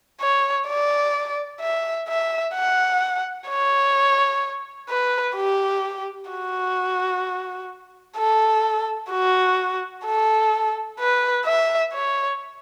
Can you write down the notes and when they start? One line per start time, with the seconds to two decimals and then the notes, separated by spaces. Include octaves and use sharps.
0.21 C#5
0.68 D5
1.61 E5
2.09 E5
2.54 F#5
3.49 C#5
4.89 B4
5.36 G4
6.31 F#4
8.18 A4
9.11 F#4
10.05 A4
11.00 B4
11.45 E5
11.93 C#5